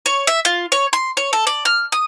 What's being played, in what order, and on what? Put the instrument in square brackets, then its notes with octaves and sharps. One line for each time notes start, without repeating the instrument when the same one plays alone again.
[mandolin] C#5
E5
F4
C#5
C6
C#5
A4
D5
F6
D#6